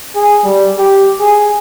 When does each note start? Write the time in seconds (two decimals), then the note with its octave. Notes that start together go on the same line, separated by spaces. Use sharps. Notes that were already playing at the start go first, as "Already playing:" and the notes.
0.15 G#4
0.44 G3
0.79 G4
1.21 G#4